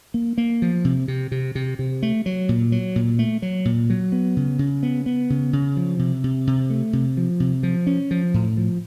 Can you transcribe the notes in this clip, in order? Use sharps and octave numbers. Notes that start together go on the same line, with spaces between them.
A#3
A#3
F3
C3
C3
C3
C3
C3
A3
F#3
A#2
F#3
A#2
A3
F#3
A#2
F#3
B3
C#3
C#3
B3
B3
C#3
C#3
F3
C3
C3
C3
A3
C3
F3
C3
F3
C#4
F3
A2
F3